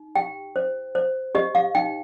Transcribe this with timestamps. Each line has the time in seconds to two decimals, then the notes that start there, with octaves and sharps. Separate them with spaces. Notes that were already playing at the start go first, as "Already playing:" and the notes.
Already playing: D#4
0.15 G4 G5
0.56 C5
0.95 C5
1.35 G4 D#5
1.55 F5
1.75 D#4 G5